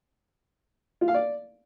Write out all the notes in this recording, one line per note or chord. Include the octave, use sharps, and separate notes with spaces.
F4
F5
D5